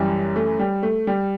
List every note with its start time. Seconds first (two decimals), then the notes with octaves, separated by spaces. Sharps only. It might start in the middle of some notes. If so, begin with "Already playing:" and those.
Already playing: F#2 E3 G3
0.36 A3
0.59 G3
0.83 A3
1.07 G3